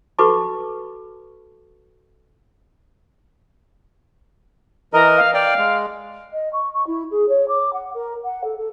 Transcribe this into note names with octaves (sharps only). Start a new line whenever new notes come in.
F#4 A4 B4 A5 C#6 D6
E3 A#4 D#5 A#5
F5
D5 F5 G5
G#3
D#5
C#6
C#6
E4
G#4
C#5
D6
F#5
A#4
F#5
A4
A4